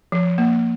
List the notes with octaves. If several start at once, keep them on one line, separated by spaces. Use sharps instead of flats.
F3
A#3